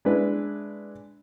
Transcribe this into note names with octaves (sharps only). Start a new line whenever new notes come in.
G#3 D4 E4 B4